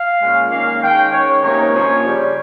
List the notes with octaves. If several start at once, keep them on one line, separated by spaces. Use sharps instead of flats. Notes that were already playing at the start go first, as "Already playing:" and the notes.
Already playing: F5
A#2 G#3 C#4
D#3 A#3 C#4 F5
D#3 G#3 C#4 G5
D#3 G#3 C#4 C#5
C3 D#3 A#3 C#4 C#5
G2 F3 A#3 C#4
C#3 G3 C#4